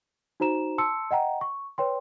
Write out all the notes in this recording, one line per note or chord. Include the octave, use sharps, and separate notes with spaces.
D#4 F#4 C5 A#5 E7
A5 C6 E6 C#7
D#5 F#5 G5 A#5
C#6
B4 C#5 G5 C6